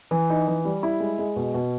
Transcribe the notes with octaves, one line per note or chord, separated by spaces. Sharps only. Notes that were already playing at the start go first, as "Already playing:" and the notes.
E3
D#4
E3
G3
E4
G#3
G#3
B2
B2